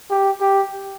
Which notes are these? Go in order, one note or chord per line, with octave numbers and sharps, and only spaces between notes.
G4
G4